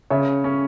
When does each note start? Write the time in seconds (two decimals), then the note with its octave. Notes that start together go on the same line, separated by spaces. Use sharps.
0.10 C#3 C#5 E5
0.44 C#4